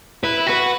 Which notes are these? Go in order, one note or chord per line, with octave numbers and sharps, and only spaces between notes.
E4 B4
F#4 B4